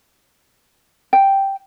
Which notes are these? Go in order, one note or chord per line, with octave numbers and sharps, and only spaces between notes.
G5